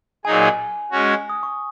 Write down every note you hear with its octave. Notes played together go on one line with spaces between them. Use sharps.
A#2 F#3 D#4 G#4 G#5
G#3 C#4 F#4
D#6
C#6